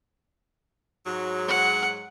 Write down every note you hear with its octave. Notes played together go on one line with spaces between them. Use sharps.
G#2 F#3
F#5